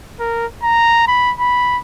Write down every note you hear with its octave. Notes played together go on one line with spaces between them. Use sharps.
A#4
A#5
B5
B5